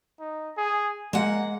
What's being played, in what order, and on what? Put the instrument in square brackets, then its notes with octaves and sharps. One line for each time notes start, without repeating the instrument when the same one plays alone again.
[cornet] D#4
G#4
[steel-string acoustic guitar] G#3 F#5 [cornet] A#3